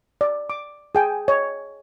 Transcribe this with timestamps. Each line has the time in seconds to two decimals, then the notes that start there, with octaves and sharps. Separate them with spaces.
0.21 D5
0.50 D6
0.95 G#4 G5 G#5
1.28 C#5 D#5